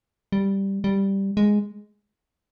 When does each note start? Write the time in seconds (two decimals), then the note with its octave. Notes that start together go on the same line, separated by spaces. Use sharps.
0.32 G3
0.84 G3
1.37 G#3